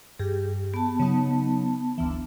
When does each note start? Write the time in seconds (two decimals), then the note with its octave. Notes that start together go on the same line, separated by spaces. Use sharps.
0.19 G2 G4 G#4
0.74 B3 A5
1.00 C#3 F#3 D#4
1.98 G1 D2 E3